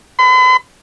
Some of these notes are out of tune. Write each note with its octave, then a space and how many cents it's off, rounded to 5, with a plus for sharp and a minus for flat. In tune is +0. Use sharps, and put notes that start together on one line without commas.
B5 +45